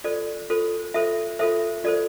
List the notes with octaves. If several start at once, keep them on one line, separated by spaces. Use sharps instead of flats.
F4 A4 C5 D5
F4 A4 C5
F4 A4 C5 E5
F4 A4 C5 E5
F4 A4 C5 D5